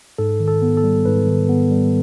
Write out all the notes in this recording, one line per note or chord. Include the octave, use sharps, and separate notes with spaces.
G#2 A4
D#3
A4
B3
A4
G3
G#2 B4
D#3
B3
G3